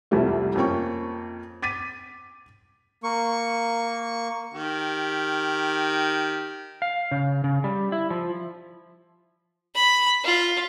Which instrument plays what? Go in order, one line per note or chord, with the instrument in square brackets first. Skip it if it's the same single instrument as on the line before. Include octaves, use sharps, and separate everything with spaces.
[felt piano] C2 F2 C3 G3 A3
F2 A#3 C#4 G5 C#6
D6 A6 B6 D#7
[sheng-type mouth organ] A#3 C#6
[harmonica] D#3 G4
[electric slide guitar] F5
C#3
C#3
G3
E4
F3
[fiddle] B5
F4